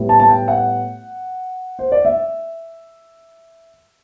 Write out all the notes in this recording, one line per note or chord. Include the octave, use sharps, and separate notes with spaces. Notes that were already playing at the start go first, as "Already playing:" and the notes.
Already playing: A2 G3 B3
A5
A5
G5
F#5
C5
D5
E5